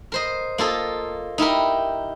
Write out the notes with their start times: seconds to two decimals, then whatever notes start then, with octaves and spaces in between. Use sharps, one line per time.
0.12 A#4 C5 D#5
0.58 A#3 F4 A4 D#5
1.38 D#4 E4 G4 A#4